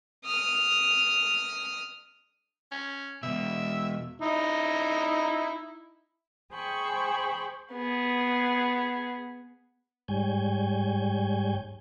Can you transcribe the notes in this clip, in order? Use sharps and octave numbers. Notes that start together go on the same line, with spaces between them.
D#6 F6
C#4
E2 B2 E5
D#4 E4
G#4 C5 G5 B5 C#6
B3 G#4
G#2 G3 C#5 G#5 G6